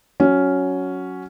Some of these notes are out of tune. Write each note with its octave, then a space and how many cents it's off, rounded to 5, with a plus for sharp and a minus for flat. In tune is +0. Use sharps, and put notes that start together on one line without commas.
F#3 +0 C#4 +5